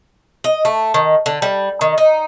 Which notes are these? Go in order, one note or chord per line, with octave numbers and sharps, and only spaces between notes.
D#5
A3
D#3
D3
G3
D#3
D#4